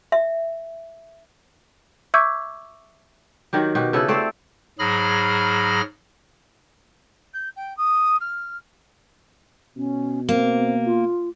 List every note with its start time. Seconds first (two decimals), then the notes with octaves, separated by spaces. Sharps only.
0.12 E5
2.14 E5 C#6 D6 E6 G6 G#6
3.53 D#3 F#3 G4
3.75 B2 F#4 G4
3.93 C#3 B3 E4 A4
4.08 A3 C4 C5 D5
4.79 G#2 F#3 G#4 B5 F6 A#6
7.33 G6
7.56 G5
7.77 D#6
8.20 F6
9.76 B2 C#4
10.29 A#3 C4
10.85 F4